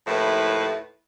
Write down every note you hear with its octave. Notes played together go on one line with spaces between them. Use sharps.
D#2 A2 F3 E4 B4